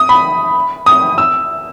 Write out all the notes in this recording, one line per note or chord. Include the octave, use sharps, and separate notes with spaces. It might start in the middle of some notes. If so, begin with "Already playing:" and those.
Already playing: D#6
B5
D#6
E6